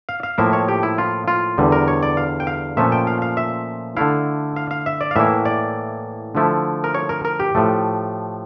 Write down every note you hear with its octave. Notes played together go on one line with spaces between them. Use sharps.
F5
F5
A2 F3 A#3 E4 E5
C#5
G4
E4
F4
F4
E2 D3 G3
A#4
C#5
D5
F5
G5
F5
A#2 F3 A3 C#4 E5
G5
F5
F5
E5
D3 A3 E4 F5
F5
F5
E5
D5
F5
A2 E3 A#3 E4 E5
D5
D3 F3 A3 E4
A#4
C#5
A#4
A#4
G4
A2 F3 A3